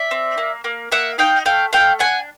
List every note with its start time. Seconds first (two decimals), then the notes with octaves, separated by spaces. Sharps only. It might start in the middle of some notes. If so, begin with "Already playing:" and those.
Already playing: D5 E5
0.11 C4
0.38 A#3
0.64 A#3
0.92 A#3 E5 F#5
1.18 D#4 F5 G5
1.45 A3 F5 G5
1.73 A3 F5 G5
1.99 D4 F#5 G#5